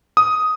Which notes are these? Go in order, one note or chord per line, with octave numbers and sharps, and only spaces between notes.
D#6